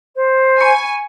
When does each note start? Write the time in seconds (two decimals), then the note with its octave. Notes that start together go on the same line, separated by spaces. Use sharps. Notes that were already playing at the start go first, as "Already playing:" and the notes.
0.15 C5
0.61 G#5 B5 C#6 C#7